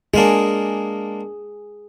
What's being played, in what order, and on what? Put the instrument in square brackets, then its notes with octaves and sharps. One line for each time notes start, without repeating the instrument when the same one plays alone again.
[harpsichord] G#3 A#3 D4 [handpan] G#4